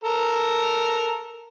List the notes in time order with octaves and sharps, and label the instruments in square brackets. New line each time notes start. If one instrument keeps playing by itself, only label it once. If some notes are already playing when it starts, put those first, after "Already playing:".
[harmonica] A4 A#4 A#5